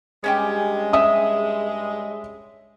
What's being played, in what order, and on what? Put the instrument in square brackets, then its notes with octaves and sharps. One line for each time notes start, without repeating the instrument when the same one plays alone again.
[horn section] G2 G#3 [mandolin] C#4 E4 G4
[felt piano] E5 D#6